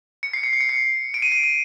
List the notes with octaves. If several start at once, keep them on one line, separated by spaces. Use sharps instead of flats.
C#7
C7
C#7
C7
C#7
C7
D7
D#7
D7
D#7